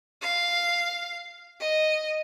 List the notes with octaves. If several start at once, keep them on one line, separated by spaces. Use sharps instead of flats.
F5
D#5